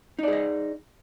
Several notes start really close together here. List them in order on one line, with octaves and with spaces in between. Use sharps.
D#4 D5 G#4 D#5